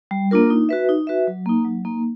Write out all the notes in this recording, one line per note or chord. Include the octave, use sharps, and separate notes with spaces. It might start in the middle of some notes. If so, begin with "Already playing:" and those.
G3
A#3 D4 F4 A#4
D#4
F#4 B4 E5
D#4
F#4 B4 E5
F#3
A#3 D#4
F#3
A#3 D#4